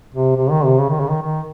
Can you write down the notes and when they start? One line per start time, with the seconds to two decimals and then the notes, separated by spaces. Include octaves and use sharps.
0.14 C3
0.36 C3
0.51 D#3
0.65 C3
0.79 C#3
0.90 D#3
1.00 C#3
1.10 D#3
1.22 D#3